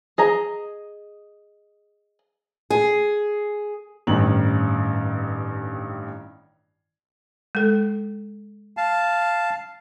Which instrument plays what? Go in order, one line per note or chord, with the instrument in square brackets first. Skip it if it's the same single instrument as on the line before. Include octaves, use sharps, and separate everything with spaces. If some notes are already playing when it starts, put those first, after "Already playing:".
[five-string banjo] G#4 D#5 A#5
[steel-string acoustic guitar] G#4
[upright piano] A1 G2 D#3 C#4 D#4 F#7
[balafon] G#3 A4
[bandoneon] F5 A5